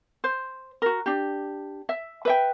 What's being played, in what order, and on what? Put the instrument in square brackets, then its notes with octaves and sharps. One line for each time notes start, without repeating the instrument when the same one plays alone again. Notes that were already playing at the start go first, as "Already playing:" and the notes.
[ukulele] C5
F#4 A#4
D4 G4
E5
B4 E5 G5